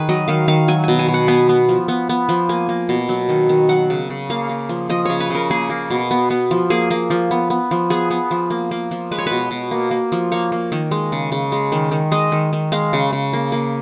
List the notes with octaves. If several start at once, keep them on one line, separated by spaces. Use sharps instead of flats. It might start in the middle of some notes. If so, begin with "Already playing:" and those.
Already playing: D#3 G#4 B4
F#3 D#5
D#3 F5
D#3 F5
F#3 G#5
B2 G#5
G#5
B2
F#5
B3 G#5
B3
F3
B3
B3
F3
A#3 G#5
A#3
B2
F#3
D#3
D#3
F#3 F#5
C#3
C#3
A#3 F5
A#3
F3
F3 D#5
C#3 C#5
B4
C#3 A#4
A#3 G#4
A#3
B2
B3
B3
F3
A#3 G#4
A#3
F3
B3
B3
F3
B3 G#4
B3
F3
A#3
A#3
F3
G#3 B4
C#5
B4
B2
B2
A#3
A#3
F3
A#3 C#5
A#3
D#3
G#3
C#3
C#3
G#3
D#3
D#3
G#3 D#5
D#3
D#3
G#3 F5
C#3
C#3
A#3
A#3